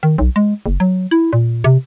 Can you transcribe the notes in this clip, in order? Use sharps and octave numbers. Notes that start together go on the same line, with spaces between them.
D#3
B1
G#3
F#1
F#3
E4
A#2
C3